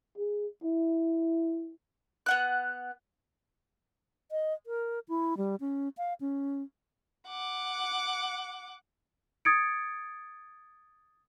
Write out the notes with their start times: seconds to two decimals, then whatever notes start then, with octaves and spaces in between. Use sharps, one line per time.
0.18 G#4
0.64 E4
2.26 B3 F#5 F#6
4.31 D#5
4.66 A#4
5.09 E4
5.37 G3
5.60 C#4
5.98 F5
6.21 C#4
7.27 F#5 D6
9.45 D#6 G#6 A6 C#7 D7